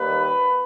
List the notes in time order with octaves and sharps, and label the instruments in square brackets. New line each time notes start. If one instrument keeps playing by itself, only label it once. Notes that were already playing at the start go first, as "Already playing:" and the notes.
Already playing: [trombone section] D#2 D#3 G3 A#3 B4